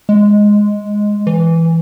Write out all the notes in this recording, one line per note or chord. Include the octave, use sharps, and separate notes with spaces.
G#3
E3